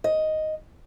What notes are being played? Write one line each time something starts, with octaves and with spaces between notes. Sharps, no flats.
D#5